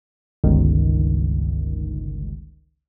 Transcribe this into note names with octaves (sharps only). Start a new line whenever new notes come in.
G1 C#2 D#3